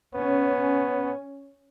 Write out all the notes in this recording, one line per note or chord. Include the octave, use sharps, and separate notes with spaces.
B3 C#4